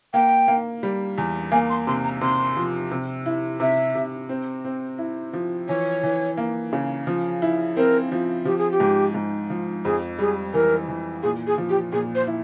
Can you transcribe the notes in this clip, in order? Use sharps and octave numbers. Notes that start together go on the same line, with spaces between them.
A#3 G5
A#3
G3
E2
A#3 G#5
C6
C3 C6
A#5
C3 C6
F3
C3
E4
C3 E5
C3
C4
C4
E4
F3
E3 C#5
E3
A#3
C#3
F3
E4
C4 A#4
F3
F3 G4
G#4
G4
G#2
G#2
F3
F2 G#4
G3 G#4
E3 A#4
E3
A#2 G#4
G#4
F3
G4
A#2 G#4
C5
E4